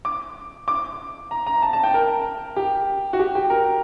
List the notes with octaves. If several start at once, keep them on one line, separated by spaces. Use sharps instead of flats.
D6
D6
A#5
A#5
A5
A5
G5
A#4
G4
F#4
G4
G4
A#4